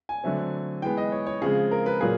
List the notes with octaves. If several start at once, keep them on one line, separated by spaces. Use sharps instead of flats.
G#5
D3 F#3 A3 C4
E3 G#3 B3 G5
D#5
C#5
C#5
C#3 F3 G#3 C4 G#4
A#4
B4
A#2 F#3 A#3 G#4